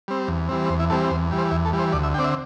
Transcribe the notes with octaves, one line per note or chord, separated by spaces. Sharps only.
G3 C4
E2
E3 G3 C4
E2 C5
E4
E3 G3 C4 A4
E2 C5
E3 G3
C5
E2 E4
A4
E3 G3
C5
D2 D5
E5
D3 C4 D5 G5
E5